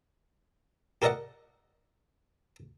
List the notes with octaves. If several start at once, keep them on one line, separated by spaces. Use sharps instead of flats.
G4 A4 A#4 D5 D#5 F#5